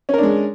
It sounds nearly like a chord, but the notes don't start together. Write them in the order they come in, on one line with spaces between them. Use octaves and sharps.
C#4 A#4 D4 G#3